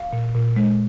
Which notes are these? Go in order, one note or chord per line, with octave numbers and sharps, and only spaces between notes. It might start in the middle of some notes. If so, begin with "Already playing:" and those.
Already playing: F5
A#2
A#2
G#3